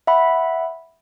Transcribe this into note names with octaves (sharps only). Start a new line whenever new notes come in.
E5 F#5 B5